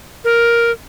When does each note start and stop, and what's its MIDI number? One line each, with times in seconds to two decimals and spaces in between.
0.24 0.71 70